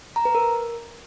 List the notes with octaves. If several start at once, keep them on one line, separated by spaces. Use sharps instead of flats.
A#5
B4
A#4